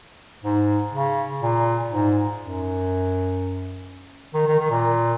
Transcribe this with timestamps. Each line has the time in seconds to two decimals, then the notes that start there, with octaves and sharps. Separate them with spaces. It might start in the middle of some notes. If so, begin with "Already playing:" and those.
0.44 G#2
0.93 C#3
1.42 A#2
1.90 G#2
2.39 F#2
4.34 D#3
4.47 D#3
4.59 D#3
4.70 A#2